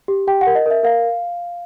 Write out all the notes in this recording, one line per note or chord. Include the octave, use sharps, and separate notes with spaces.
G4
G4 G5
F#5
A#4
D#5
A#4 E5
A#4 F5